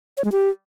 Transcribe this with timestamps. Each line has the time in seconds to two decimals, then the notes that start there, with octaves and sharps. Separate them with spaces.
0.17 C#5
0.25 G#3
0.32 G4